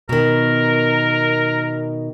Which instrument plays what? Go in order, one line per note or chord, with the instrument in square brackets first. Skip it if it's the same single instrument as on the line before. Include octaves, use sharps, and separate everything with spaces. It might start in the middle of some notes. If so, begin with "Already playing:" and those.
[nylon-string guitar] B2 D#3 [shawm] A#4